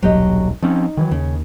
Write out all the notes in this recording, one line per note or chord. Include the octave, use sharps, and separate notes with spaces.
D#1 B1 F#3 G4 D#5
F3 C4 C#4 D#4
D#3 E3 F#3
D#2 C#3